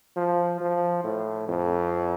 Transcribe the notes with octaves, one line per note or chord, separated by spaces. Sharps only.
F3
F3
A2
F2